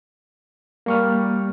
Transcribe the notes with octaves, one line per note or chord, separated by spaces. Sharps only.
G3 A#3 C#6 F6